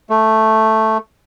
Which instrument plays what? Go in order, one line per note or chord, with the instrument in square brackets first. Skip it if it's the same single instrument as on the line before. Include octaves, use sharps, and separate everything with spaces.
[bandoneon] A3